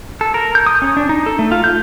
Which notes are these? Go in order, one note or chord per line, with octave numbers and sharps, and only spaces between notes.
A4
A#4
G6
D#6
C#4
D4
D#4
A4
A3
F4
G6